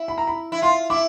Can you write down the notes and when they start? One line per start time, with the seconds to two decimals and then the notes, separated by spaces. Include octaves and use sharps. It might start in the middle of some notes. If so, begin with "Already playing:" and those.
Already playing: E4
0.08 B5
0.18 A#5
0.27 B5
0.52 E4
0.62 F4 C6
0.90 E4 D6